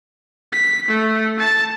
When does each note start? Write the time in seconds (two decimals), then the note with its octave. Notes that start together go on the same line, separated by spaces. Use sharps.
0.53 B6
0.88 A3
1.39 A5